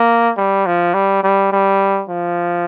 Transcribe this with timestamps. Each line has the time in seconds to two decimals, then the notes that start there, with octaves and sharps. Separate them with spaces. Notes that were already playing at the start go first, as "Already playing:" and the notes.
Already playing: A#3
0.37 G3
0.66 F3
0.94 G3
1.23 G3
1.52 G3
2.09 F3